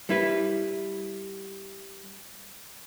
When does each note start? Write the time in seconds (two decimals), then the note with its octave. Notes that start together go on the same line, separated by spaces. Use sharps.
0.09 G3 E4 B4